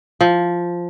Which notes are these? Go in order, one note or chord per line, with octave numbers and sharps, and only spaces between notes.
F3